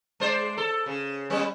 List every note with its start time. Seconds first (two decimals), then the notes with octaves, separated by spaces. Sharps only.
0.20 G#3 C5 D5
0.57 A4
0.86 C#3
1.30 G3 B3 C#4